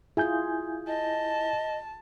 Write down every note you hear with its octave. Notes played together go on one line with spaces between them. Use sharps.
E4 F4 G#4 G#5 G6
D#5 A5